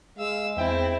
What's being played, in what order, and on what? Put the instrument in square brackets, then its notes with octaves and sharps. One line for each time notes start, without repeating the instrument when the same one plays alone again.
[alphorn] G#3 [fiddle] F5 E6
[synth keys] E2 E5 G5 [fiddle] C4 E4